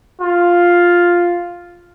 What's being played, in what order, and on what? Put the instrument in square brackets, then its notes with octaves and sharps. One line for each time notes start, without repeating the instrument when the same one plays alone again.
[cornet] F4